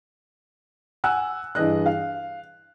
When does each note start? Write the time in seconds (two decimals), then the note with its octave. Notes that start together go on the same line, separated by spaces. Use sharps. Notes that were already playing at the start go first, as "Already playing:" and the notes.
1.04 F#5 G#5 E6 F#6
1.55 G2 E3 G#4 D#5 F#6
1.86 F5